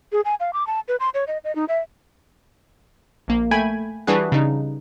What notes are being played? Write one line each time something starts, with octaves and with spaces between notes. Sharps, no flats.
G#4
G#5
F5
D6
A5
B4
C6
C#5
D#5
D#5
D#4
E5
A#1 A#3
A3 G5 G#5 B5 G#6
E3 G3 D4 F#4 G#4 B4
C#3 G3 D#4